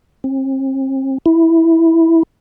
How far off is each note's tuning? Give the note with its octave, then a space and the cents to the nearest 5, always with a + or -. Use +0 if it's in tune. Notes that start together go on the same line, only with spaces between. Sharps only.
C4 +40
E4 -5